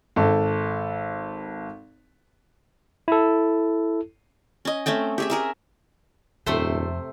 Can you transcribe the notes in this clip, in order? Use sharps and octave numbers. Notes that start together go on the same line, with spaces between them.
G#1 A4
E4 A4
C#4 D#5
A3 C4 C#4 G5
G4 G#4 E5
G#4 A#4 E5
D#1 F2 C3 A3 A4 C5